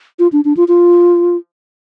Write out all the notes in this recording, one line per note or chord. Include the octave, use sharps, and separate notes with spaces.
F4
D4
D4
F4
F4